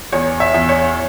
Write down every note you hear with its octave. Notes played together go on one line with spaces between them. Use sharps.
E2 C#5
E5
E2
C#5